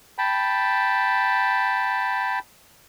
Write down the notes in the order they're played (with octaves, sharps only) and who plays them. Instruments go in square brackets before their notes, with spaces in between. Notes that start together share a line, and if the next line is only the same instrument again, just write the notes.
[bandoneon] G5 A5 B5